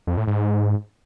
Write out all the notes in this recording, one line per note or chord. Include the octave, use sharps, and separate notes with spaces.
F2
A2
G#2